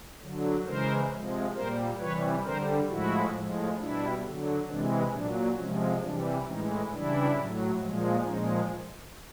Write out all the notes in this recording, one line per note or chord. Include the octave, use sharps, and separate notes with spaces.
D3 F#3
C#3 E3 G#3 A#4 C5
C3 F3 G#3
A#2 G3 A#4 C5
C3 E3 G3 B4 C#5
D3 G3 A#4 C5
A2 F3 G#3 E4 F#4
A2 F3 G#3
B2 G3 D4 E4
D3 F#3
C3 E3 G#3 D4
A#2 F#3 D4
C3 F3 G#3 C#4
C3 E3 G3 D4
A2 E3 G#3 C#4 D#4
C#3 E3 G3 D4 E4
A2 F#3
A#2 F3 G#3
A#2 F3 G#3 C#4 D#4